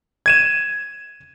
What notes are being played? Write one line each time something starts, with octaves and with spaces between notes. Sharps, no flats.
G#6 D#7 E7